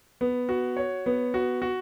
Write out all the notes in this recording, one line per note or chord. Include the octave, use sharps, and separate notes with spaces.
B3
F#4
C#5
B3
F#4
F#4